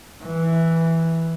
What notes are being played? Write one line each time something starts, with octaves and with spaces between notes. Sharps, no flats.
E3